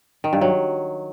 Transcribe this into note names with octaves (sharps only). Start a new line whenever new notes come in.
D#3
G2
F#3